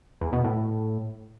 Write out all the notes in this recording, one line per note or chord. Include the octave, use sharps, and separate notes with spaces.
E2
B2
A2